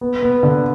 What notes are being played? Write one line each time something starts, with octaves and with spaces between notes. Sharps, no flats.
B3
B3
D3